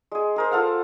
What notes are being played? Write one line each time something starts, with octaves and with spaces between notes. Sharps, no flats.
G#3 G#4
G#4 A#4 C5
F4 A4 F5 F#5